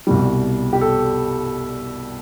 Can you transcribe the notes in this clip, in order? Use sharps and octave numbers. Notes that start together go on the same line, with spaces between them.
C2 B2 G3
G4
A4